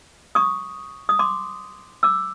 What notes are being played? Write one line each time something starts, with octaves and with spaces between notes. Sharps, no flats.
C#6 D#6
D#6
C6 D6
D6 E6